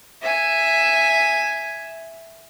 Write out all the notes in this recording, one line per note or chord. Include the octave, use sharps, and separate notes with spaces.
E5 G#5